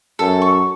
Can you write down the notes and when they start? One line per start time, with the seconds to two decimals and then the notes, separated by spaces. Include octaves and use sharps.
0.19 F#2 A4
0.42 C#6